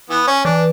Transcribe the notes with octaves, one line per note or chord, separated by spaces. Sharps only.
E3 B3
C#4
E3 D4